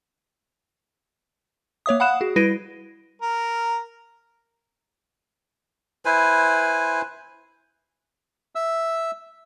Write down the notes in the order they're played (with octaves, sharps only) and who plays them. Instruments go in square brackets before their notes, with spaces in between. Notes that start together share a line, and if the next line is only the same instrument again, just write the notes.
[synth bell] A#3 C#5 E5 D#6
F5 F#5 B5 D#6 F#6 E7
F#4 G#4
G3 E4 B4 A#6 D7 D#7
[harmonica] A#4
[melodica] E4 B4 C5 G#5
[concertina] E5 E6